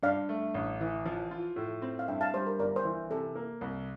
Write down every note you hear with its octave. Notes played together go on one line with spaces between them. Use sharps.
G2 D5 F5
A3
A1
E3
F3
F4
A2
C4
F5
G2 E5 G5
F5 A5
G3 C5
A#4
G1 A#4 D5
C5
E3
C3 A4
A#3
C2